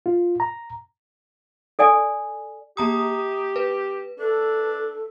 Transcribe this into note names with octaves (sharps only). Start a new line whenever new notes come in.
F4
A#5
A4 D5 G#5
A#3 G4 A#5 D#6
B4
D4 A4